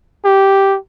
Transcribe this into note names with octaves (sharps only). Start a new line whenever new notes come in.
G4